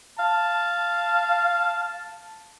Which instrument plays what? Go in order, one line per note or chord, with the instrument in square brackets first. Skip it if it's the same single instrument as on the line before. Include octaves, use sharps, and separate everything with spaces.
[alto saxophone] F5 [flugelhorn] A5